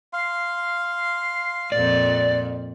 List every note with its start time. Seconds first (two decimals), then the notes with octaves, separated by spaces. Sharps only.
0.13 F5 C6
1.72 F2 A#2 D5